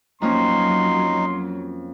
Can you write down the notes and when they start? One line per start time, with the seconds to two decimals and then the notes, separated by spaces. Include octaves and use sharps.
0.22 F2 F#3 A#3 C#4 D#4 C6